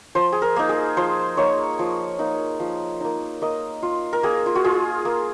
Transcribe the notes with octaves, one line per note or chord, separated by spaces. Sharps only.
F3 C5
G#4
A#4
A#3 D#4
G#4
F3 C5
A#3 D#4 C#5
F3
A#3 D#4
F3
A#3 D#4
A#3 D#5
F4
A#4
A#3 G#4
F4
F#4
F4 G#4
A#3